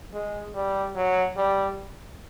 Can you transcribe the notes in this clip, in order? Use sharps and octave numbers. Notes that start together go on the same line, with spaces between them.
G#3
G3
F#3
G3